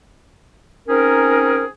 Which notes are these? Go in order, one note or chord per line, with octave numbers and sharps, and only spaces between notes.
C4 C#4 D#4 G#4 A#4